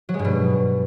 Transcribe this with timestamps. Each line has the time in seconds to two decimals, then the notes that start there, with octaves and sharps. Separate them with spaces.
0.09 F#3
0.14 G#3
0.19 G2
0.25 B2